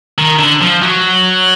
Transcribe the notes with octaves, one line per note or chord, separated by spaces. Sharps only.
D#3
D3
F3
F#3